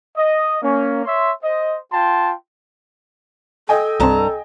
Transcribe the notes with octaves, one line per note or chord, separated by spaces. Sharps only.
D#5
A#3 C#4
C#5 E5 C6
C5 D#5
F4 G5 A5 C6
A4 D#5 G5 G#5
C2 G2 C3 C4 A5 A#5